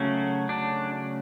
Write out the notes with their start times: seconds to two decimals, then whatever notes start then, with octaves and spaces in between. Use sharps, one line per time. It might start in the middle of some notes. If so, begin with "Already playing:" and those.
Already playing: C#3 F#3 A3 C#4
0.49 D4